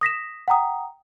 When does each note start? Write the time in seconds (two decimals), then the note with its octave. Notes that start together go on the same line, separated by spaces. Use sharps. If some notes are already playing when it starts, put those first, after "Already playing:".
0.01 D#6 A#6 B6 E7
0.48 F#5 G5 A#5 D#6